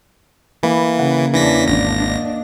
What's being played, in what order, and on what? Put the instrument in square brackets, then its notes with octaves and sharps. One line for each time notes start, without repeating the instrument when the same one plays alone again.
[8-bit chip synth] E3 [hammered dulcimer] A#3 B5
[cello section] C#3 [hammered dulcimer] F#5
[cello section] E2 C#4 D4 [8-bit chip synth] E3 A#6 B6
[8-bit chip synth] G#1 A#6 [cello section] D4
[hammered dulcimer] D#5